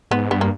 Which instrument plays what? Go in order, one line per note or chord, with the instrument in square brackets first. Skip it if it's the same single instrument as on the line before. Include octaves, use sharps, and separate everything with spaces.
[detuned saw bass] G#2 [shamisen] B3
[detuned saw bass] G2 [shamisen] B3
[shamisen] A#3